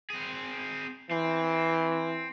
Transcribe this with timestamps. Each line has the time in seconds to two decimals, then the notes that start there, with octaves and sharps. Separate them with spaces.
0.10 C4 G#4
1.11 E3 C4